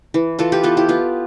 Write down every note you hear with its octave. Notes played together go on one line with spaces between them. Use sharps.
E3
E3 F4 A4
G4 B4
B3 F4 A4
E4 G4
B3 F4